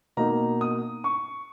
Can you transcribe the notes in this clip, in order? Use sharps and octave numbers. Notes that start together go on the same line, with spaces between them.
B2 A#3 D#4 A#5
D#6
C#6